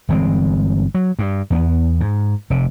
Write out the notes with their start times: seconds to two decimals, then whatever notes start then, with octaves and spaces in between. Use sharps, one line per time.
0.09 G1 E3 G#3 C4
0.95 F#3
1.19 G2
1.50 E2 A#3 B3
2.01 G#2
2.50 F1 C3